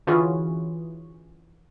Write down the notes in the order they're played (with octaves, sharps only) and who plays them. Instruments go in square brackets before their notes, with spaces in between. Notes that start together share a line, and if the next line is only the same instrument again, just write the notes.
[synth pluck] D3 E3 C#4 F4 F#4 G#4